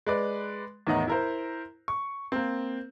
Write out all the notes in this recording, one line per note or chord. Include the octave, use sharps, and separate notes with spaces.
G#3 B4 D5
E2 A2 D#3 D#5 F#5 A#5
E4 A#4 C5
C#6
A#3 C4